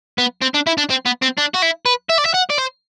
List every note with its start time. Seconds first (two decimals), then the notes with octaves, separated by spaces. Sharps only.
0.18 B3
0.42 C4
0.54 D4
0.67 E4
0.78 D4
0.90 C4
1.06 B3
1.22 C4
1.38 D4
1.54 F#4
1.62 E4
1.86 B4
2.10 E5
2.18 D5
2.26 E5
2.34 F#5
2.50 D5
2.58 C5